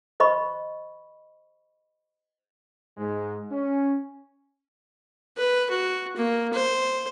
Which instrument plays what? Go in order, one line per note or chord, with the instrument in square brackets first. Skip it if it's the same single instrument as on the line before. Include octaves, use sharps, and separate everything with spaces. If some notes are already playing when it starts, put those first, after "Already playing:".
[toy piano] C5 D#5 B5 C#6
[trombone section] G#2 G#3
C#4
[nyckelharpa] B4
F#4
A#3
C5